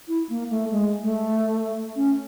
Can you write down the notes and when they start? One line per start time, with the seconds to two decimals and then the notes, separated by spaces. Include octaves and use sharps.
0.08 E4
0.29 A#3
0.50 A3
0.71 G#3
1.03 A3
1.96 C#4